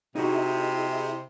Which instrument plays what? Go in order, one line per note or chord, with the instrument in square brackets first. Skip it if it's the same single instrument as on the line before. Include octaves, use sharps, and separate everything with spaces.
[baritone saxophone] C3 [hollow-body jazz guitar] D#4 F#4 [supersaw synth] E4 G#4 D#5